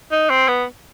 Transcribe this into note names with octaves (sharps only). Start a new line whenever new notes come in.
D#4
C4
B3